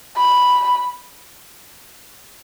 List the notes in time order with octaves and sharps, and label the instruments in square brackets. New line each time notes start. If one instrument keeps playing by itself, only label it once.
[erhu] B5